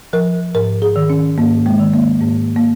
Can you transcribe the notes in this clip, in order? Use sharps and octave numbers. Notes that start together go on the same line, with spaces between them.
F3 A#4
G#2 A#4
G#4
D#3
C#4
G#2 A#3
G#3
D#3
A#3
G#2 A#3
A#3